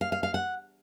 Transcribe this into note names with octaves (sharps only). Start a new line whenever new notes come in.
F5
F5
F5
F#5